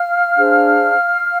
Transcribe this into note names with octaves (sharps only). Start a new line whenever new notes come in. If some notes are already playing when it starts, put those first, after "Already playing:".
Already playing: F5 F6
D4 G#4 C5